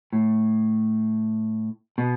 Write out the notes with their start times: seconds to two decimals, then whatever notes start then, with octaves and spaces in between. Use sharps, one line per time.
0.13 A2
1.98 B2